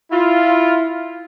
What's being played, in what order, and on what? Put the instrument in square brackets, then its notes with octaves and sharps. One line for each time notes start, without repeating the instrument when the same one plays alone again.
[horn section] E4 F4